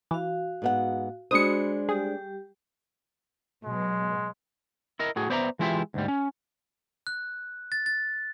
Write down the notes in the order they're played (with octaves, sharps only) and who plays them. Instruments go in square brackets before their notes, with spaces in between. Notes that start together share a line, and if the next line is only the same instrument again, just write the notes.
[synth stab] E3 [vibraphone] F#4 F5
[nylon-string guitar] G#2 B3 F#5
[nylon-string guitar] G#3 D4 C5 [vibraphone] F#4 B5 [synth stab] D#6 C#7
[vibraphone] G3 G4 [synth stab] G#4
[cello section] B2 F#3 [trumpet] G#3
[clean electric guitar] E4 A#4 D#5
A2 F#4 G#4
B3 C5 D5 E5 G5 A#5
E3 G#3 E4 F4 G4 E5
D2 G#2 G3
C#4
[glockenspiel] F#6
A6
A6